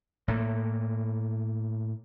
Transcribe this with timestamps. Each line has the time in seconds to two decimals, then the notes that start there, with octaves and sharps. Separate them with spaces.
0.28 A2 A#3